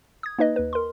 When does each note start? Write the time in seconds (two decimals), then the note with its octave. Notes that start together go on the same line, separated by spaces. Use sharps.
0.23 D#6 G#6
0.38 A#3 D#4 B4 D#5
0.56 D#2 B4
0.73 A#4 C6